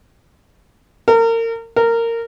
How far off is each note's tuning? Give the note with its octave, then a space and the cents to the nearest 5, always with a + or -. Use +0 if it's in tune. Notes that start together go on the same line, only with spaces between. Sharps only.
A#4 -30
A#4 -15